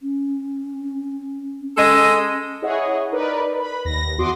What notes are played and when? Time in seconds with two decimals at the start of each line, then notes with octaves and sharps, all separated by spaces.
0.02 C#4
1.77 G#3 C#4 A4 D#5
2.62 E4 G#4 C#5 D#5 F#5
3.11 D#4 A#4 B4 D5
3.56 B4 B5
3.85 D#2 A#6
4.18 E2 F#4 C6 D6 D#6